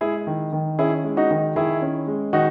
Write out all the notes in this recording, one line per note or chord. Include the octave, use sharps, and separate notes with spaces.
G#3 E4 G#4
D#3
D#3
C#4 E4 G#4
G#3
D#4 F#4
D#3
D#3 E4 G#4
C#4
G#3
D#3 D#4 F#4